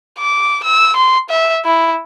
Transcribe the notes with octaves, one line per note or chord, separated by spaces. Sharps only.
D6
E6
C6
E5
E4